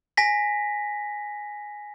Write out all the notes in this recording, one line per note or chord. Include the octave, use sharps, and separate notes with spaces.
G#5 A#6 B6